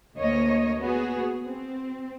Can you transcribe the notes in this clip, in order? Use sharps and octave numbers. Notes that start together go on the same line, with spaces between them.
D2 A#3 C#5 D#5
B3 F#4 G#4
C4